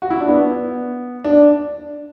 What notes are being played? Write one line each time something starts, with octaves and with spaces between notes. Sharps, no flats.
F#4
E4
D4
B3
D4